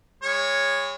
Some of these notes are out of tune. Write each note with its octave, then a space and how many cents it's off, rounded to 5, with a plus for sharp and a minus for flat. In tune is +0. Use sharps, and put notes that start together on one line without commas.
G#3 -40 C#5 +0